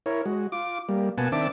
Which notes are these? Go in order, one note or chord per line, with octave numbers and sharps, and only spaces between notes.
E4 A#4 C#5
G#3 F#4
F4 D6
G3 A#3
B2 A#3 B3 F#5 G#5 A5
D#3 C4 D4 E5 A5 D6